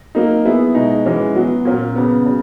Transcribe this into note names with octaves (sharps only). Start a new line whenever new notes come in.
F#3 A#3 D#4
F#3 B3 E4 G#4
B2 G#3 D#4
E3 G#3 C#4 F#4
F#3 B3 F#4
A#2 A#3 C#4
C#3 F#3 B3
C#3